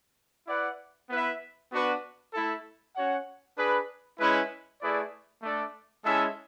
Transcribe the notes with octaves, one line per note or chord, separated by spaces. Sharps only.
E4 B4 D5 F#5
B3 E4 B4 E5
B3 D4 F#4 B4
A3 E4 A4
C#4 F#4 C#5 F#5
D4 G#4 B4
G#3 C#4 E4 B4
A3 E4 G#4 B4 D5
A3 D4 A4 D5
G#3 C#4 E4 A4 E5